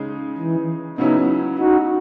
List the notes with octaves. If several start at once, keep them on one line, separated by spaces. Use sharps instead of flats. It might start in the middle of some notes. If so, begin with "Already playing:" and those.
Already playing: C#3 G#3 D#4
E3
C#3 F#3 B3 C#4 D#4 E4
D#4 F#4